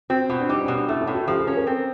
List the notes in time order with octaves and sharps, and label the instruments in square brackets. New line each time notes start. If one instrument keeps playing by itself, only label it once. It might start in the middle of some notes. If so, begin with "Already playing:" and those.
[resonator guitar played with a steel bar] C4 [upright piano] F#4
[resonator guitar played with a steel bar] B2 [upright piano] F4
[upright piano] D4
[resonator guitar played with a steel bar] G3 [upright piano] D#4
[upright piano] C#4
[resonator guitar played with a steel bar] B2
[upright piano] D4
[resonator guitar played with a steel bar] A3 [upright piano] E4
[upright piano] C#4
[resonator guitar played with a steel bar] A2
[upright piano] F#4
[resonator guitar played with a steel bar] F3 [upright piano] G4
[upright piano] G#4
[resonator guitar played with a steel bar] C#4 [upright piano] A4
[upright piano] A#4
[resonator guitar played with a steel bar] C4